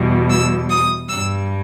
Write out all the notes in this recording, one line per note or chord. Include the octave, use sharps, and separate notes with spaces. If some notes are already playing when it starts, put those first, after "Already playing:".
Already playing: E2 B2 G3
E6
D#6
G2 G3 E6